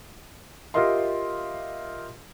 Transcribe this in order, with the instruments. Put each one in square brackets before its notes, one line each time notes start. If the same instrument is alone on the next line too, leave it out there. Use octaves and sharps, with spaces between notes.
[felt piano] F4 G4 A#4 D#5 E5 C6